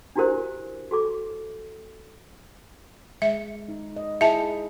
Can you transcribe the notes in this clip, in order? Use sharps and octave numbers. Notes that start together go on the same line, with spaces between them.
D4 E4 F#4 G4 A#4 C5
F#4 A4 D6
G#3 E5
D#4
D#5
E4 G#4 E5 A5